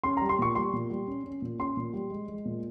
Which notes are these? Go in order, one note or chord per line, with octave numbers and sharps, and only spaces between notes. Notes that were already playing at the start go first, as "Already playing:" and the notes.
C#4 C6
A#5
G3
C6
A#2 C#6
G3 C6
A#2
G3
C#4
C#4
A#2
C#4 C6
A#2
G3
G#3
G#3
A#2